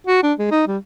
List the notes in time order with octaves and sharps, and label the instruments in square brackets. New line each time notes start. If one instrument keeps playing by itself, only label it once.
[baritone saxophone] F#4
D4
G#3
D#4
G3